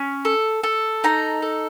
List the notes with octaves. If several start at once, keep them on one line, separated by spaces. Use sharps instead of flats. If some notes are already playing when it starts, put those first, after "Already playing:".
Already playing: C#4
A4
A4
D#4 A#5
A4